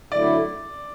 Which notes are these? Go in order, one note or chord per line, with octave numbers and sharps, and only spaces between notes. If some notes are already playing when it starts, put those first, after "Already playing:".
D3 F#3 A3 E4 D5